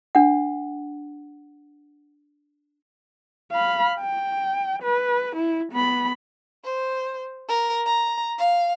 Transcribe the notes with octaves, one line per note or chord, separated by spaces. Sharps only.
D4 F#5
F5 B5
G5
B4
E4
B3 B5
C5
A#4
A#5
F5